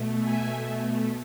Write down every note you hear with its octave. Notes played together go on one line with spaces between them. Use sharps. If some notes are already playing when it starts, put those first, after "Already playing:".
Already playing: B2 A3
E5 G#5